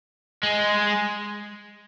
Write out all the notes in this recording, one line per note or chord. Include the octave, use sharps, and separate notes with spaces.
G#3